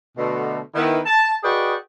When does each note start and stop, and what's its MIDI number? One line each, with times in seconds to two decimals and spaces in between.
0.18 0.59 47
0.18 0.59 50
0.18 0.59 57
0.75 0.99 51
0.75 0.99 59
0.75 0.99 64
1.06 1.34 81
1.44 1.74 66
1.44 1.74 68
1.44 1.74 71
1.44 1.74 74
1.44 1.74 75
1.44 1.74 79